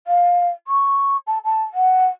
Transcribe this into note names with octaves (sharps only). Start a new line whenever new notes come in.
F5
C#6
A5
A5
F#5